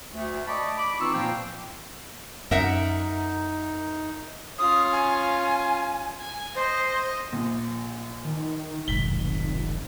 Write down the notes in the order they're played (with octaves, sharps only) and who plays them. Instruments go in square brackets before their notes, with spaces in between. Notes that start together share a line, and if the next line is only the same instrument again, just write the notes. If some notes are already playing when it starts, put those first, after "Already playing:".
[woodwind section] D2 A3
D5 D#5 A5 B5 C#6 D6
B5 D6
E3 C4 D#4 F4 C#6 E6
A#2 F3 A#3 F4 C5 G5
[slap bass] F#2 [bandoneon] D#4 [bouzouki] A#4 E5 F#5
[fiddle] C#4 F4 [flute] D#6
[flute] G#5
[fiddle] G#5
[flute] C5 [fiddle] D#5
[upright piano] A#1 A#2
[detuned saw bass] D#3
[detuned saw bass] F1 [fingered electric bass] B1 G#2 D#3 [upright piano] B6 G7